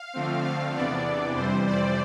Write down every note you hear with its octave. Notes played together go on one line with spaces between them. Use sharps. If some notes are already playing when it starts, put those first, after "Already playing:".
Already playing: F5
D3 F3 A3 C4
F5
E2 C3 E3 B3 D4 D5
F2 C3 E3 G3 C5
D5